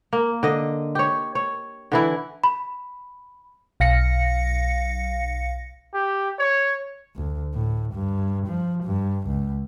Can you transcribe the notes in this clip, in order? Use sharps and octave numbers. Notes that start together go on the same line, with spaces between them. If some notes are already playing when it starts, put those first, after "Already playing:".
A#3
D3 D#5
G4 C#5
C#5
D3 E3 E4
B5
B1 F5 A#6 C#7
G4
C#5
D2
A2
G2
F3
G2
C#2